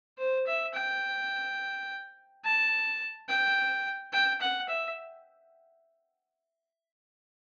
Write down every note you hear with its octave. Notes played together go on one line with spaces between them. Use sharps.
C5
E5
G5
A5
G5
G5
F#5
E5